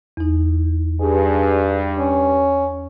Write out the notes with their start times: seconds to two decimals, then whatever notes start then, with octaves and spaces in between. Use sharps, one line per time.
0.17 E2 D#4
1.01 G2 G#4
1.99 C#4